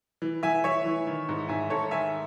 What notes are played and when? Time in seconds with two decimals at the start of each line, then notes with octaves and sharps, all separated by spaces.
0.22 E3
0.43 E3 E5 G#5
0.64 E3 C#5 E5
0.85 E3
1.07 D#3
1.29 G#2
1.49 G#2 E5 G#5
1.70 G#2 A4 C#5
1.91 D#3 E5 G#5